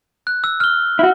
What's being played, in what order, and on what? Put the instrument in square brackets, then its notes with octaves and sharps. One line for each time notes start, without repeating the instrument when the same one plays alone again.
[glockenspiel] F#6
E6
F6 G7
[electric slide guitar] E4 F#4